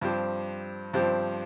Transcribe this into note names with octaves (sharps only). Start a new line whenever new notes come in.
G2 F3 C4 G4
G2 F3 C4 G4